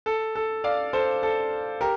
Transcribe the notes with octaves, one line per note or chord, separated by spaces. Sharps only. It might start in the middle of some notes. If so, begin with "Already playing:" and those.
A4
A4
D5 F5
A4 C5
A4
G4 A#4